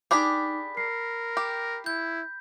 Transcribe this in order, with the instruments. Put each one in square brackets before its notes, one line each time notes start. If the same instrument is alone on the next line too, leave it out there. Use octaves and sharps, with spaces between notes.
[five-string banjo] D4 G4 G#4 [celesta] D#4 D6 [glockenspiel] B5 B6
[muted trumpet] A#4 [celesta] C7
[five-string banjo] G4
[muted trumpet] E4 [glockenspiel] G6